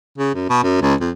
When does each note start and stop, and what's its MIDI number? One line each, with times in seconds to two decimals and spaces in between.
0.18 0.34 49
0.34 0.47 42
0.50 0.62 47
0.63 0.77 42
0.81 0.94 37
1.01 1.10 41